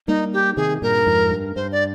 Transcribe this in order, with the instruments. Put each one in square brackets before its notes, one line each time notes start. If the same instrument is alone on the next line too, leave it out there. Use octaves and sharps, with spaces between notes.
[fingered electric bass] G3 A#3 [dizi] D#4
[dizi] G4
[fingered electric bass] C3 D#3 [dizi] G#4
[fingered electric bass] G2 A#2 [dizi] A#4
[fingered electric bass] F2 G#2
G2
[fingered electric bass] G2 [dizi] C5
[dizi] D5